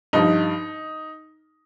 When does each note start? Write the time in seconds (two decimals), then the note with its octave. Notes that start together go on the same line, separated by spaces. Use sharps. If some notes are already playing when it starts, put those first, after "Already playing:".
0.13 G2 F3 D#4